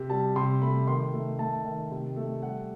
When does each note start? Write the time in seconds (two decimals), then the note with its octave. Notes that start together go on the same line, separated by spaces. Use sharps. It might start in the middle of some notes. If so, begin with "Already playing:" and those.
Already playing: C3
0.10 G3 A5
0.36 C3 C6
0.62 A3 B5
0.87 D#3 C6
1.14 A3
1.39 A3 A5
1.65 D#3
1.91 C3
2.16 A3
2.42 G3 F#5